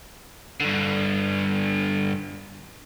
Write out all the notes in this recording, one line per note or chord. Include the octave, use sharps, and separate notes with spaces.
G2 D3